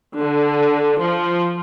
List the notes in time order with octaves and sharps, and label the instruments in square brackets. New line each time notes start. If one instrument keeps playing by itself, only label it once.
[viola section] D3
F3